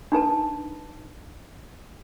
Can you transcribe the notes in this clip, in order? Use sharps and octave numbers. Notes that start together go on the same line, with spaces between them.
D4 D#4 B4 A5